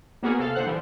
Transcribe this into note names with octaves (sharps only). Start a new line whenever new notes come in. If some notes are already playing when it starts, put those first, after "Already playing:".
A#3 B3 F#4 G#4 A#4
C3 A4 F5 F6
A#2 D3 C5 F#5 F#6
E3 F3 G3